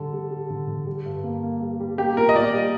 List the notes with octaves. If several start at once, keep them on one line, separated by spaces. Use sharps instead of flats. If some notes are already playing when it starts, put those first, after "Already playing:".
Already playing: D3 G3 A4
G3
G3
D3
D3
G3
G2
A#3
A#3
G3
G3
A#3 G4
A#2 A#4
D#5
A#2 D5
G3